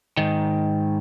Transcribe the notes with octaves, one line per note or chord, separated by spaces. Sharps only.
G#2 D#3